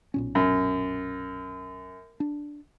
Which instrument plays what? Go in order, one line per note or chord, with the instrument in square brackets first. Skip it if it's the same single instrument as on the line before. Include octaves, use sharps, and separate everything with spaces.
[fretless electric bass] B1 A#2 C#4
[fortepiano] F#2
[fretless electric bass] D4